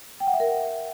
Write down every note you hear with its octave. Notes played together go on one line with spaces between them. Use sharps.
G5
F#5
E5
A#4